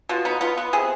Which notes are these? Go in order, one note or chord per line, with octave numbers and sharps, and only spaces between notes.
B2 F4
B3 D#4
B3 F4
B3
C3 G#4